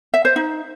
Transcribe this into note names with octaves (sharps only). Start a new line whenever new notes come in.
E5
C5
D#4